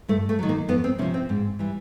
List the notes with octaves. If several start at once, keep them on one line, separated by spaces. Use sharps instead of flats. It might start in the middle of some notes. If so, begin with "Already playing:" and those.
G2 A3
A3
D#3 F#3
A#3
F2 B3
C4
C3 F3 C#4
C4
G#2
E3 G3